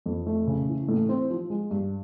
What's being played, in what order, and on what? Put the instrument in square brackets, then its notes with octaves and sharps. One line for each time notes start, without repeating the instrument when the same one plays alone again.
[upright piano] F2
A3
C#3
E3
A2
C4
F3
G#3
G2